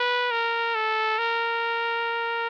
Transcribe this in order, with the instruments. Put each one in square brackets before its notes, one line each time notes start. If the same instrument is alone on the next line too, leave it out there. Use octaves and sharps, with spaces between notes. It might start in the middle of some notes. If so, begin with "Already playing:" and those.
Already playing: [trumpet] B4
A#4
A4
A#4